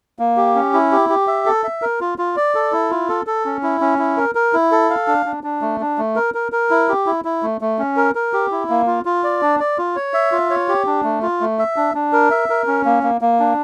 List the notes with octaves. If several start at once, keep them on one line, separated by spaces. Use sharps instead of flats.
A#3
G4
C#4
E4
G4
G4
E5
A4
E5
A#4
F4
F4
D5
A4
E4
F4
A4
A4
C#4
E4
C#4
E4
A#4
A#4
E4
A4
F5
D4
D4
D4
A3
D4
A3
A#4
A#4
A#4
E4
G4
E4
E4
A3
A3
C#4
A#4
A#4
G4
E4
A#3
F4
F4
D5
D4
D5
F4
C#5
E5
F4
C#5
G4
D4
A3
F4
A3
E5
D4
D4
A#4
E5
A#4
C#4
A#3
A#3
A#3
D4